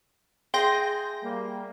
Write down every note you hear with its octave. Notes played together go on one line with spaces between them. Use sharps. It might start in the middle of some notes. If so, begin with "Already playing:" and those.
G#4 E5 G5 G#5 C6 G6 A#6
G3 A#3